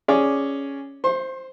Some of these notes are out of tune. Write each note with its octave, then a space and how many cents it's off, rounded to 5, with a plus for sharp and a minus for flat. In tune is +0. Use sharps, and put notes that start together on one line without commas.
C#4 +0 G#4 +0 D5 +0
C5 +0 C6 +40